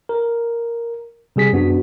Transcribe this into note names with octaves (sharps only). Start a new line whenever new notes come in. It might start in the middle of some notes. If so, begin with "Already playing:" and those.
A#4
C3 G3 G#4 B6
F#2 B3 D4 F#4